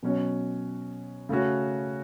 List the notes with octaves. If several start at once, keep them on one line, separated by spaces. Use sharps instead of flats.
B2 F#3 C#4 F#4 C#5
C#3 A3 C#4 F#4